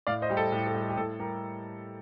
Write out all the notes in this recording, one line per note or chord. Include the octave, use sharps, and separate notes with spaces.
A2 D5 F5
C5 D#5
G3 G4
A4
A2 G4
A4
G3
A4
G4
A2 A4
G3 G4 A#4